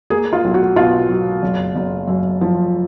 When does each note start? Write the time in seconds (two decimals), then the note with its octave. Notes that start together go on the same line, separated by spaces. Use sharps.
0.10 A#3 G#4
0.33 F4
0.44 B1
0.54 F#4
0.76 B2 F4
1.09 F#3
1.42 F#1
1.76 F#1
2.07 F#2
2.41 F3